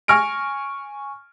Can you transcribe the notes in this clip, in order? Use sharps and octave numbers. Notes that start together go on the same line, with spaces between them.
G#5 C#6 F6 A#6 D7